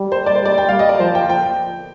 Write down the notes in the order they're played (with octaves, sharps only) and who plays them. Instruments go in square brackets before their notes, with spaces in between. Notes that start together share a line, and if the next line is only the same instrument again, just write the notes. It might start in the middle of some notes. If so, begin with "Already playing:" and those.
Already playing: [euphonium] G3
[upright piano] C5
D5
C5
[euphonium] G3 [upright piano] D5
[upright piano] G5
[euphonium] G3 [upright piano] F5
[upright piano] D#5
D5
[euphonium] F3 [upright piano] C5
[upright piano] G5
G5